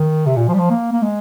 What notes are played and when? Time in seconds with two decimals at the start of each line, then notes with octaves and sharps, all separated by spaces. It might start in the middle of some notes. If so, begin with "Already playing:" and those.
Already playing: D#3
0.26 C3
0.36 A#2
0.48 F3
0.54 G3
0.59 F3
0.70 A#3
0.93 A#3
1.02 G#3